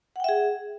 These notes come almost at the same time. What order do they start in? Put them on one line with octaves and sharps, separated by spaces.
F#5 G5 E5 G#4